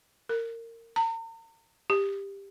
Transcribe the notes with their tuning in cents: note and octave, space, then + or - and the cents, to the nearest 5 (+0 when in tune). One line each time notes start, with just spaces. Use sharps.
A#4 -25
A#5 -40
G4 +15